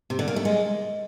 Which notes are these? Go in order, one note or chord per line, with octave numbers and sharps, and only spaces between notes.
C3
D3
A#3
A3
G#3